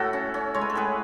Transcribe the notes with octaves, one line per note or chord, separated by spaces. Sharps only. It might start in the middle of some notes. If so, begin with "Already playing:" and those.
Already playing: A2 E4 F#4 A4
C#4
C#4
G#3 C#5
B4
A4
A2 G#4 B4